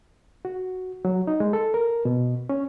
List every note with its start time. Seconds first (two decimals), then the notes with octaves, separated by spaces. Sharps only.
0.45 F#4
1.05 F#3
1.27 D#4
1.40 G#3
1.53 A4
1.74 A#4
2.05 B2
2.49 C#4